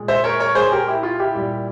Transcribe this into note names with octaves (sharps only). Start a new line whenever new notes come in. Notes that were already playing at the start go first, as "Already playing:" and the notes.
Already playing: A#2 G#3
C5 E5
A#4 C#5
A#4 C#5
G#4 C5
G4 A#4
E4 G4
F4
E4 G4
A#2 G3